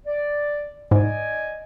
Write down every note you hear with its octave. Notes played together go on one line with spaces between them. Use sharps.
D5
G#2 D5 D#5 G#5